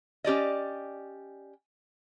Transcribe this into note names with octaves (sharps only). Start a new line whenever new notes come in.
C#4 G4 D5 D#5